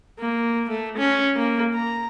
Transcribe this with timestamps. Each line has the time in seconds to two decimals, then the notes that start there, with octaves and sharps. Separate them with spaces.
0.20 A#3
0.69 A3
0.97 C#4
1.37 A#3
1.74 A#5